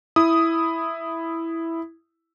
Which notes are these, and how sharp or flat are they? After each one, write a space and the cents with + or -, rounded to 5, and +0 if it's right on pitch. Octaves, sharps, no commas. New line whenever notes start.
E4 +0 D#6 +0